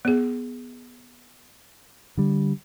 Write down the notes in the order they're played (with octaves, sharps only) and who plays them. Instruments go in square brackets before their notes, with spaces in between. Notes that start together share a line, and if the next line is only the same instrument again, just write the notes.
[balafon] B3 G#4
[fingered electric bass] D3 G3